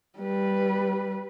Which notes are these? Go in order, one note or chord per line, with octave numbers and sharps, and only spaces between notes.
G3 B4